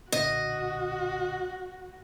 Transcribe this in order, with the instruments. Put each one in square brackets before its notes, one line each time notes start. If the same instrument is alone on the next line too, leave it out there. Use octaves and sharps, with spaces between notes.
[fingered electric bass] B1 A#2 D3 [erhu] F#4 [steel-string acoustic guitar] D#5